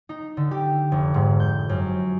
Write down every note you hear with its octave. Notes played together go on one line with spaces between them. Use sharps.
D#4
D3
G4
F1
G#2
G6
F#2